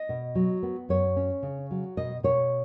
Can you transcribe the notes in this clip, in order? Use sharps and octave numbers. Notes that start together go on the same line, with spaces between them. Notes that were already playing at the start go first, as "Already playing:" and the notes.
Already playing: D#5
B2
F#3
B3
F#2 C#5
C#4
C#3
F#3
B2 D#5
B2 C#5